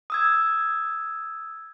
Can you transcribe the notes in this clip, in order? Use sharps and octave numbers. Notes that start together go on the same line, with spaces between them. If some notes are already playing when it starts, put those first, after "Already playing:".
D#6 E6 G#6